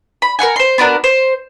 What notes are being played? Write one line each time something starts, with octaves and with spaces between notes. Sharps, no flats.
B5
A#4 B4 F#5 G#5
C5 C6
B3 D4 F#4 A#4
C5